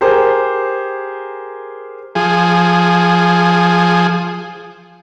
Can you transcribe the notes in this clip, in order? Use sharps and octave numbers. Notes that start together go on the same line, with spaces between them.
G4 G#4 A#4 C5
F3 G#4